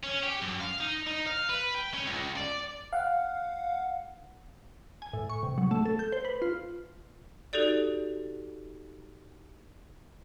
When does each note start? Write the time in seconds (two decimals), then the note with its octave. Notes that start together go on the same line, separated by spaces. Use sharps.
0.04 C#4
0.23 G4
0.42 F#2
0.60 F5
0.80 D#4
1.07 D#4
1.27 F5
1.50 B4
1.74 G5
1.93 C#4
2.05 C#2
2.36 D5
2.93 F5 F#5
5.02 G#5
5.13 A2
5.29 C#6
5.43 C3
5.58 F#3
5.71 A3
5.85 A4
5.99 G6
6.12 C5
6.25 B4
6.42 F4
7.53 D#4 F#4 G4 A4 D5